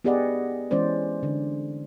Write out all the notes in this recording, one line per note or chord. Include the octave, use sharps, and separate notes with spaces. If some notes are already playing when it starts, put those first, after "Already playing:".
B3 G4 G#4 D5 D#5 F#5
E3 G#3 C#4 C5 D5
D3